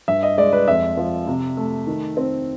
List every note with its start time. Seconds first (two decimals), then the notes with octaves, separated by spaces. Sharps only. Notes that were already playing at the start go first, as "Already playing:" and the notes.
0.08 G2 E5
0.23 D#5
0.37 G#3 D5
0.53 B4
0.68 F2 E5
0.97 F3
1.27 C3
1.57 A3
1.87 D#3
2.17 C4